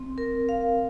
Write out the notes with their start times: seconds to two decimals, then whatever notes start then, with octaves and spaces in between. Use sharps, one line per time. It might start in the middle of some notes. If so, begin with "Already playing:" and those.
Already playing: C4
0.18 A#4
0.49 F5